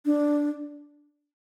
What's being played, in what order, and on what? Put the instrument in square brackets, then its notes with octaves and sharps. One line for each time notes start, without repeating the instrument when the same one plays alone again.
[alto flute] D4